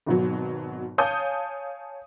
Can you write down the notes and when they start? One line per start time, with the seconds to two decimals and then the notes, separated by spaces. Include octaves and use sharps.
0.06 G#1 B2 F#3
0.98 C#5 F5 G#5 A5 D#6 G6